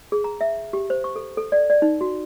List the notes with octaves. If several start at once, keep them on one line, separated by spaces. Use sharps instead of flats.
G#4
A#5
E5
G4
C5
C#6
A4
A4
D5
D5
D#4
F#4